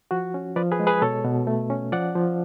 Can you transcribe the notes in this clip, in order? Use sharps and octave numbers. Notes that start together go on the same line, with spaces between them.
F3 F#4
C#4
F3 B4 D5
G#4 B4
G#3
G#4 B4
B2 A4 C#5
B2
A3
C#4
F3 D5 F#5
F3